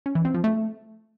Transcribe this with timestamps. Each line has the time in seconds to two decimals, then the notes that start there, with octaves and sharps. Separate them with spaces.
0.06 C#4
0.15 E3
0.25 C4
0.34 F3
0.44 A3